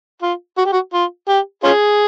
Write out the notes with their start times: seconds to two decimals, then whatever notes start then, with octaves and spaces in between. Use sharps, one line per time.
0.22 F4
0.58 F#4
0.66 G4
0.73 F#4
0.93 F4
1.28 G4
1.64 C#4 F4 G#4